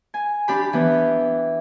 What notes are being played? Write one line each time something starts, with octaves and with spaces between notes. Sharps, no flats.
G#5
D4 G4 B5
E3 B3